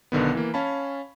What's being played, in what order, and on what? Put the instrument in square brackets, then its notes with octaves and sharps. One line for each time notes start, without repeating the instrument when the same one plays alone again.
[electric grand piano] B1 D3 D#3 B3
E3 A#3
C#4 F5 A5 B5